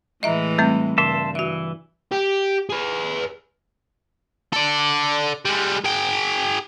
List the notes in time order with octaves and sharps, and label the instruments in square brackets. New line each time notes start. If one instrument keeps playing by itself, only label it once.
[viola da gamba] A2 E3 G#3 [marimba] D#5 E5 A#5
[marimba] G3 A3 C4
[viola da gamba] G2 [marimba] C#3 [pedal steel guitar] E5 A5 C6
[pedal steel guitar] E3 [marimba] F#4 E5
[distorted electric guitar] G4
G#4 B4
A4 D5
G3 G#3
G#4 G5